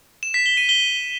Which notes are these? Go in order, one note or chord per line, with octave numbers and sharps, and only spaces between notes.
E7
B6
G7
D#7
G7